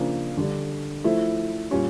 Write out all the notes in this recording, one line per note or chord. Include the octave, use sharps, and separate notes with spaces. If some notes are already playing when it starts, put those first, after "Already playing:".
Already playing: C#3 F3 A#3 D4
D3 G3 D4
F3 A3 E4
A#2 G3 C#4